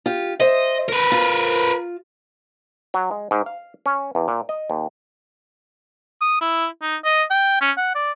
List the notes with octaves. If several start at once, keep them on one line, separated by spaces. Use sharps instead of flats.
F4 G4
C5 D#5 E5
A#4 B4
F4
F#3
G#3
G#2
F5
C#4
E2
A#2
D#5
D#2
D#6
E4
D#4
D#5
G5
C#4
F#5
D5